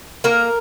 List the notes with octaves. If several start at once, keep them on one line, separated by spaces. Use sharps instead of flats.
A#3 A#4